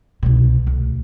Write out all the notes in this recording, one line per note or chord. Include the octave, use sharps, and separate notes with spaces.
C2 B2
D2